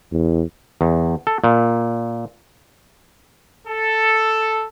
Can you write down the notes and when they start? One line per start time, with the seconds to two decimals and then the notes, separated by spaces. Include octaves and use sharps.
0.12 E2
0.81 E2
1.27 A4
1.44 A#2
3.67 A4